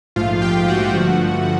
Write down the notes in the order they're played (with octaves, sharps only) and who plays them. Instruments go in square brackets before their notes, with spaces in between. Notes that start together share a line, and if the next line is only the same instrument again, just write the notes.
[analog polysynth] A#1 G#2 F3 A3 F4 F5
G4 G5
F#4 F#5
G2 D3 F3 A3